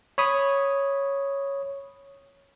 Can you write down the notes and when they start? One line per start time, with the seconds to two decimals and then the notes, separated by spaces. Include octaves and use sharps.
0.18 C#5 B5 D#6